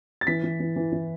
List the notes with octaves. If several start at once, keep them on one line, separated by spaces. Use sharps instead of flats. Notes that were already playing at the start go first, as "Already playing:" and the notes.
A6
E3 B6
E3
E3
E3
E3